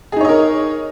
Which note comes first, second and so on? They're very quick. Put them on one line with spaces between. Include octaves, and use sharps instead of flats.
G#4 D#4 C#5 D#5 A#4